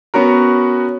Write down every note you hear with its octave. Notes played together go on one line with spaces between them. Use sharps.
B3 C#4 F#4 A#4